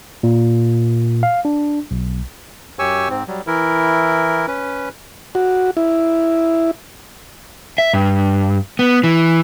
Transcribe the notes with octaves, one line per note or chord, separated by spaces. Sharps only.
A#2
F5
D4
B1
F#2 G4 C#5 G#5 C#6 E6
G#2 C4
F#3 G3
E3 E4 A#4
C#4 B4
F#4
E4
E5
G2
B3
E3